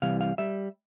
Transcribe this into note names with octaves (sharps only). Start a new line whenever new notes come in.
C2 C3 E3 G3 F5
F5
G3 E5